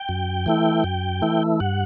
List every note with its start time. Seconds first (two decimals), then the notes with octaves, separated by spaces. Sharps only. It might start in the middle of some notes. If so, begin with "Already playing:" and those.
Already playing: G5
0.09 F#2
0.46 E3 A3 E4
0.84 F#2
1.22 E3 A3 E4
1.60 G2 F#5